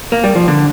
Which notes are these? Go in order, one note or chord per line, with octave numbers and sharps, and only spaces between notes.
A#3
G3
F3
D3